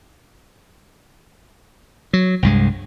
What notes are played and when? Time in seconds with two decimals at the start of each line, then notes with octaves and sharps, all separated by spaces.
2.13 F#3
2.43 C2 G2 G#3